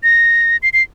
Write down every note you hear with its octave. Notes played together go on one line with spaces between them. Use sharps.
A#6
C7
C7